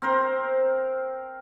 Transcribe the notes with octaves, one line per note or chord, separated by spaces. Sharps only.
C4 A#4 C5